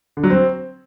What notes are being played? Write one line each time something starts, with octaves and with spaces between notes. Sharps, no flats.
D3
F#3
C4